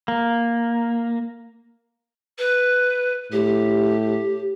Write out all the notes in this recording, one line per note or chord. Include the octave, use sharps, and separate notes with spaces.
A#3
B4
A2 G4